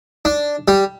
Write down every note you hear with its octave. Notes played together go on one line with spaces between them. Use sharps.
D4
G3